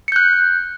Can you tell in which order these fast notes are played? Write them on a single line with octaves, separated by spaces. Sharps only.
C#7 G6 F#6